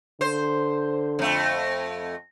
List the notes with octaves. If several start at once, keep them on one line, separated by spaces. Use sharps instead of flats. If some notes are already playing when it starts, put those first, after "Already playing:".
D3 C5
F2 A3